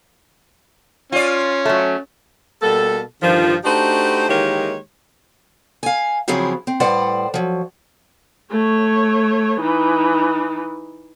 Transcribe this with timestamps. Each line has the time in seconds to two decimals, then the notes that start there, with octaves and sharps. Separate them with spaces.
1.12 C#4 F4 D5
1.65 F#3 A3
2.62 B2 G3 A#3 A4
3.21 G2 D3 D#3 F3
3.64 A3 D4 D#4 F#4 G4 C5
4.29 D#3 E3 G#3 A#3 G4 C#5
5.83 F5 G#5
6.28 C#3 F3 F#3 C4 E4 G#4
6.67 C4
6.80 A2 G3 B4 C5 D5 F#5
7.34 F3 F#3
8.51 A3 C#5
9.61 E3 D#4